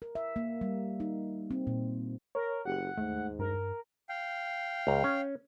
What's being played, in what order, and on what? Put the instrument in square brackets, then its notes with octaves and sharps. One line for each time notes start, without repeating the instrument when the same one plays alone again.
[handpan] A#4
E5
A#3
G3
D#4
C4
A#2
[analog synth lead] A#4 [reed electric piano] C#5
[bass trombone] F#1 [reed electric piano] G4 [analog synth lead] F#5
[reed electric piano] D#2 [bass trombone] G#2 [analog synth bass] A3
[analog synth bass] G2 [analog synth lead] A#4
[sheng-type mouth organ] F5 G5
[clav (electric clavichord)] C#2 A#5
C#4